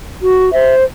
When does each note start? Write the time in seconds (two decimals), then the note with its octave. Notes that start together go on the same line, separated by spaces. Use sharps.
0.21 F#4
0.52 C5 E5